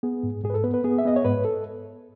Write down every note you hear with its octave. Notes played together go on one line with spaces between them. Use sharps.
B3 G#4
G#2
G#2 G#4
B4
A4
B3 B4
B4
B3 G#4
E5
B3 D#5
C#5
G#2 B4
A4